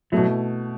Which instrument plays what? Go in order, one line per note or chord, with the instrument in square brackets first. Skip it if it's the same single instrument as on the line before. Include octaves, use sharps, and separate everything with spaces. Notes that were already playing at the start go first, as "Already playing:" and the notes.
[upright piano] B2 A3 E4 [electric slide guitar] F#3